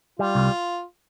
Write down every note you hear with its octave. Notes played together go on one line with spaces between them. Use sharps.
G3 F4
C2